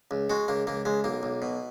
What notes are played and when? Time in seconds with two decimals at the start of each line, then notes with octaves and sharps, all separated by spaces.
0.11 C#2
0.30 G#3 F#4
0.48 C#2 A#3
0.67 C#2 A#3
0.85 C#2 G#3
1.04 B1 A#3
1.23 B1
1.42 B2